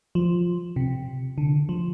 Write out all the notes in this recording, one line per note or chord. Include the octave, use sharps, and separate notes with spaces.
F3
C3
D3
F3